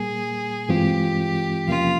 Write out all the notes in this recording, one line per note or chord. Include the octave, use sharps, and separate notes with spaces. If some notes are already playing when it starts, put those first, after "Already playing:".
Already playing: A#2 G3 A#3 G#4
G2 E3 G#3 C4 F4 G4
E2 C3 F3 A#3 C#4 F4